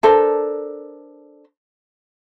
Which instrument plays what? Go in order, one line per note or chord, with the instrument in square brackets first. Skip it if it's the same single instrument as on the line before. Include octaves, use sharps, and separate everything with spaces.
[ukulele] D4 A4 A#4 C5